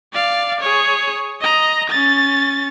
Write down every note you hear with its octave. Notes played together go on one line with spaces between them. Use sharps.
D5 F5
G#4 C#5
D#5 A#5
C#4 A6